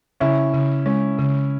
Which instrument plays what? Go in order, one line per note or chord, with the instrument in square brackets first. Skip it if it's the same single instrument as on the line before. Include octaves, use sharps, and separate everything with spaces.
[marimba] C#3 [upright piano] C#4 E4
[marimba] C#3
[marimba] G#3 [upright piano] C#4
[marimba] C#3